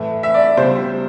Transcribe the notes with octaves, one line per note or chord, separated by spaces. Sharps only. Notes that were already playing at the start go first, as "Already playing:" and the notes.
Already playing: A2 E3 A3
E5
D5
C#2 B2 G3 C5